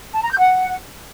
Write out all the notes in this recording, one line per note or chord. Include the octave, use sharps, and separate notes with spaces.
A5
A#5
G6
F#5